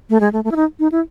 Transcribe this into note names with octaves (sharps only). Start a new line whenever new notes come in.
A3
G#3
A3
A3
E4
D#4
D#4
E4